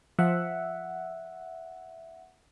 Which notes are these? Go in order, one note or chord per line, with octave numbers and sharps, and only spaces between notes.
F3 E5 F#5